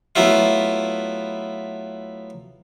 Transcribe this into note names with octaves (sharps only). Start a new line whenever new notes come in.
F#3 A3 B3 E4 F4